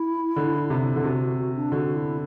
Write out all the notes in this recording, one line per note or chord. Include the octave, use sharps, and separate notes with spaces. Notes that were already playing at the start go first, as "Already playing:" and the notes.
Already playing: E4
D3
C3
D3
C3 F#4
F#4
F#4
D4
D3 F#4
F#4
E4